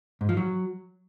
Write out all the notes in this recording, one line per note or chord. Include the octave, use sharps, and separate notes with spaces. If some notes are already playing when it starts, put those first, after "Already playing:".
G#2
F3
F#3